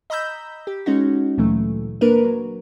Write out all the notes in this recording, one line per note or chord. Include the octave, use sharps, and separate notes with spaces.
D#5 A#5 B5 E6 G6
G4
G#3 C#4 D#4 F#4
D2 A#2 E3 F#3 A3
A#3 D4 A#4 B4
F#3